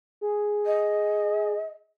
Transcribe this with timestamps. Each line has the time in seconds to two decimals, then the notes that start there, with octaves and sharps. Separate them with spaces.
0.21 G#4
0.66 D#5